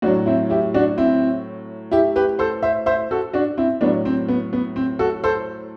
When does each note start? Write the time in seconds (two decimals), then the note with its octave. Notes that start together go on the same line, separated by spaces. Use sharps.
0.02 A2 D4 F#4
0.06 F#3
0.26 C4 E4
0.50 E4 G4
0.74 D4 F#4
0.98 C4 E4
1.91 E4 G4
2.16 G4 B4
2.39 A4 C5
2.63 C5 E5
2.86 C5 E5
3.11 F#4 A4
3.33 D4 F#4
3.58 C4 E4
3.81 A2 F#3 B3 D4
4.05 C4
4.29 B3
4.53 B3
4.76 C4
4.99 F#4 A4
5.24 A4 C5